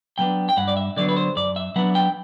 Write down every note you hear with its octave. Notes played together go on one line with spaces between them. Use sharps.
D3 F#3 B3 D4 G5
G5
G2 F#5
D5
E5
D3 F#3 B3 D4 D5
B4
C5
F#2 D5
E5
F#3 B3 D4 F#5
G5